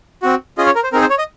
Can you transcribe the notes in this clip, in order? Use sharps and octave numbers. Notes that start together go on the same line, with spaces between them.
C4 F#4
C#4 F4 G#4 D#5
C#5
A#4
C5
C4 D#4 G#4 A#4
C5
C#5
D#5